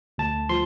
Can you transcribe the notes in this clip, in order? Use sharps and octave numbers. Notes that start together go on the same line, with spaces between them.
D2 A5
F3 C6